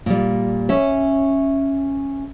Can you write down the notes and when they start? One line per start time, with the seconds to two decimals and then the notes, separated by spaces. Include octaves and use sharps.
0.06 A#2 G3
0.69 C#4 E5